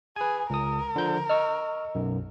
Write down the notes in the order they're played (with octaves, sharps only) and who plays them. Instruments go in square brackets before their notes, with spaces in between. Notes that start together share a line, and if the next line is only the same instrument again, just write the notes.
[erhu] G#4 [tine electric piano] B4 G#5
[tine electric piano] C#2 D#6 [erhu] A#4
[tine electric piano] D3 F3 G6
[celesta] D#5 [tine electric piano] C#6 E6 F6
[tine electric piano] B1 F#2